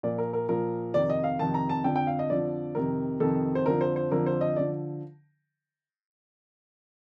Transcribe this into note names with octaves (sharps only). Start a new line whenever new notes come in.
A#2 F3 D5
A#4
A#4
A#2 F3 A#4
F2 C3 D#3 D5
D#5
F5
F2 C3 D#3 A5
A#5
A5
F2 D3 F3 G5
G5
F5
D#5
F2 D3 F3 D5
F2 C3 D#3 A#4
F2 C3 D#3 A4
C5
F2 D3 F3 A#4
C5
C5
F2 D3 F3 A#4
C5
D#5
D3 F3 D5